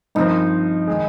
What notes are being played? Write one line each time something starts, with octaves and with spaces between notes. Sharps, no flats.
G2 F3 C4 D#4
D#3 G#3